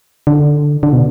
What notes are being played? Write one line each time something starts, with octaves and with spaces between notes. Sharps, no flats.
D3
D3
B2